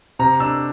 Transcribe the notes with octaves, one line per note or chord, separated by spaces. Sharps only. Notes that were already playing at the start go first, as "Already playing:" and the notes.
C3 A#5
D4 E6